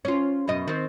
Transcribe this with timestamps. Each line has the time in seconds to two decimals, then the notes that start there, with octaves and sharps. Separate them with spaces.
0.05 C#4 F4
0.48 F#2 B2 D#5
0.67 D#3 C4